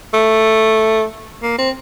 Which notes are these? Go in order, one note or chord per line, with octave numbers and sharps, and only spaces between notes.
A3
A#3
C4